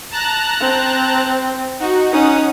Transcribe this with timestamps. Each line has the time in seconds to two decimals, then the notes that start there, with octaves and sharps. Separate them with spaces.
0.11 A5 A#5 F#6
0.61 C4
1.80 D#4 F#4
2.11 C#4 D#4 F#5 D#6